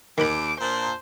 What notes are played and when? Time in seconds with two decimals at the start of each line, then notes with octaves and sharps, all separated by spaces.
0.18 D#2 D#3 B5 D6
0.60 A#2 D4 C5